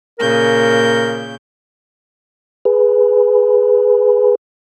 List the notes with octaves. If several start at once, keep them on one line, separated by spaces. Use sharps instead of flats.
A#2 C#3 A#4 G6
G#4 B4